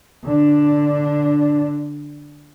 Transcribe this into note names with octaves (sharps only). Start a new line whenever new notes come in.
D3 D4